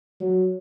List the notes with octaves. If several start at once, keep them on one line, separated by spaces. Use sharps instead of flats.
F#3